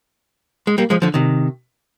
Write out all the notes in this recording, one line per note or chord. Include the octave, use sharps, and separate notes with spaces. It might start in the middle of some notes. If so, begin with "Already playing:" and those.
G#3
G3 A#3
F3 G#3
D3 F3
C3 D#3